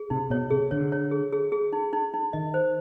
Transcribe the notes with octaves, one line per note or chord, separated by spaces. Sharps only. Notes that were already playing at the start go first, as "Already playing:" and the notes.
Already playing: G#4
C3 D#4
B2 C#5
C3 G#4
D3 C#5
C#5
G#4
G#4
G#4
D#4
D#4
D#4
D#3 D#5
C5